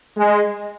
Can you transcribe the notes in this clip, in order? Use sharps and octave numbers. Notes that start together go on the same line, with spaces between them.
G#3